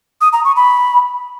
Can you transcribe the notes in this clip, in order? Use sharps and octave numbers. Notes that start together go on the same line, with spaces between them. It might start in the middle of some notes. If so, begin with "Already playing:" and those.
D#6
A#5
C#6
B5